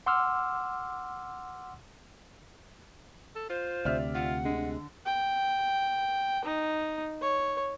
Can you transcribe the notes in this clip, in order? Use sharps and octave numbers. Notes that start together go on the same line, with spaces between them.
F#5 C6 D6 E6 F6
A4
F4 C5
D2 C3 D5 E5 F6
F4 F#5
D3 G#3
G5
D#4
C#5